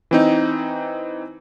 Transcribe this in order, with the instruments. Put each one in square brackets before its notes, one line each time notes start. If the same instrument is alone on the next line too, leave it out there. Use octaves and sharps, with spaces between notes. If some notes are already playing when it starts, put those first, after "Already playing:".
[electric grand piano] E3 C4 D#4